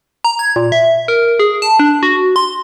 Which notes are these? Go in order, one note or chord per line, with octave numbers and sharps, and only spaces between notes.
A#5
G#6
A#2
E5
A#4
G#4
A5
D4
F#4
C6